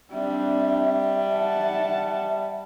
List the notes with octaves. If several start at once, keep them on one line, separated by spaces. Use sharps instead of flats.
G3 C4 D4 E5
F#5 A5